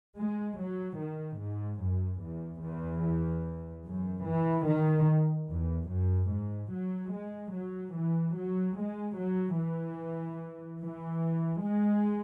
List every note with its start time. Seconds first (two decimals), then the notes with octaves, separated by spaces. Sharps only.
0.19 G#3
0.60 F#3
1.00 D#3
1.42 G#2
1.82 F#2
2.24 E2
2.64 E2
3.86 F#2
4.27 E3
4.68 D#3
5.50 E2
5.91 F#2
6.32 G#2
6.73 F#3
7.13 G#3
7.55 F#3
7.96 E3
8.37 F#3
8.77 G#3
9.18 F#3
9.59 E3
10.82 E3
11.64 G#3